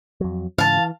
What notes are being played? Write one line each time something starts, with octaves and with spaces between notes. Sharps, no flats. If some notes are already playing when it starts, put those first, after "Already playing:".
F2 F#3
G#2 C#3 E3 F5 A5
E3